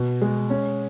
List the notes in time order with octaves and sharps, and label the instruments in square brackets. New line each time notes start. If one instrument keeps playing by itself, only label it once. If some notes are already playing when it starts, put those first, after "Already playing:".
Already playing: [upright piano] B2
G#3
C#4